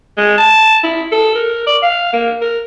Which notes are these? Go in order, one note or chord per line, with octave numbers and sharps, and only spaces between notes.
G#3
A5
E4
A4
A#4
D5
F5
A#3
A#4